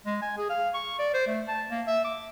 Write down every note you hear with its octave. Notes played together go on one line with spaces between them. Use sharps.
G#3
G#5
G#4
F5
C#6
D5
C5
A3
A5
A#3
E5
D6